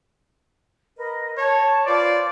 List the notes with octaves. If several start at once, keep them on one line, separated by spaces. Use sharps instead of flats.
A#4 B4 D#5
C#5 A5
F4 B4 C5 D5